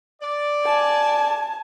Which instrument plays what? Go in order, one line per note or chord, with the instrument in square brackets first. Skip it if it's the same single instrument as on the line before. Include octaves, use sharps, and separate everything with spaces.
[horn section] D5
[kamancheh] G#5 A5